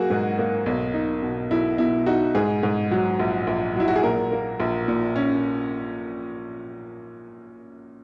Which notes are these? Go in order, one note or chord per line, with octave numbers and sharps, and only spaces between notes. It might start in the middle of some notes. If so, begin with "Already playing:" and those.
Already playing: F#3 A#3 F#4 G#4
G#2
A#3
B1
D#4
B2
B1 E4
B2 E4
D#4 F#4
G#2 G#4
G#2
F#3
A#1
A#1
F#3 E4
F#4
G#4
A#2 A#4
A#3
A#1
A#2
C#4